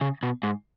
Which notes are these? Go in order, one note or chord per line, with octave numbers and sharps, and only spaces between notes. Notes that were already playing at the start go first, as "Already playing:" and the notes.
C#3
B2
G#2